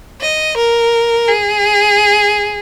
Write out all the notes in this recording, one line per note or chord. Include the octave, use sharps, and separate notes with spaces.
D#5
A#4
G#4